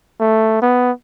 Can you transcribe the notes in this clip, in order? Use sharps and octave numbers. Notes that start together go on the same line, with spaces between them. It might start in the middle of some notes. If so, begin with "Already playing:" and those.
A3
B3